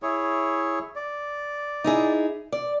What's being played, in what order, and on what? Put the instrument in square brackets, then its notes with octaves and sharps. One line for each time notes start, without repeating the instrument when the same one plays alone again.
[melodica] E4 G#4 C#5
D5
[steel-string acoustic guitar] D#4 E4 G#4
D5